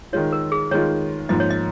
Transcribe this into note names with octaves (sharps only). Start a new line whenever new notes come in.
D#3 G#3 F4 C#5
A#4
G#4
D#3 G#3 F4 C#5
G#2 F3 A#3 D#5
C#5
D#5